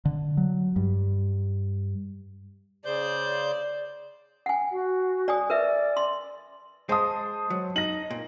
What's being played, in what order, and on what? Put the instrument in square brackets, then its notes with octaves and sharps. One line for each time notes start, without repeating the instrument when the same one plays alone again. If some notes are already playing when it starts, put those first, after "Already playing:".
[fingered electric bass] D3
F#3
G2
[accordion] C#3 C5 G6 [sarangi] D5
[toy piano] F#5 G#5
[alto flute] F#4
[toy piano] D5 G#5 D#6
[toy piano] A#4 B4 E5 [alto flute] D5
[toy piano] C6
[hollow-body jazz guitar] G#3 [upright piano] C5 A5 D#6
[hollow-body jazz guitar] F#3
[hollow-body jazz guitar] D#4 [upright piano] A#6 F#7
[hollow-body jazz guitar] A#2